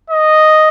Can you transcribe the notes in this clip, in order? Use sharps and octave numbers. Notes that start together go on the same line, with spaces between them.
D#5